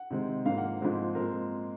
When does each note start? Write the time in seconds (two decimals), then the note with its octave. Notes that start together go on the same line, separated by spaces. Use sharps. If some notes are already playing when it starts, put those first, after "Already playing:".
Already playing: F#5
0.10 C3 D#3 G#3 C4
0.46 G#2 F3 A#3 F5
0.58 F#5
0.81 G#2 F3 G#3 C4
1.15 A#2 G#3 C4 A#4